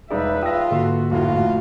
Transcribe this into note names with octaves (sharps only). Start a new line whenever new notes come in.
E1 D#4 G#4 B4 D5 E5 F5
F4 G5 A5 D#6 E6 A#6
G#2 D3 A#3 F#4 A4 E5 C6
F1 A2 F4